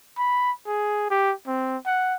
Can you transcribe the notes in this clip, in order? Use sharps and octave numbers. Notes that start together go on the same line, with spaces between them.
B5
G#4
G4
C4
F#5